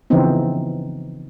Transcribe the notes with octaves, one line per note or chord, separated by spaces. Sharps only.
C#3 E3 F3 B3 C4 D#4